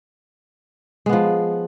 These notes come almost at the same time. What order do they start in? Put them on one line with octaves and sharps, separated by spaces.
G#3 B3 F3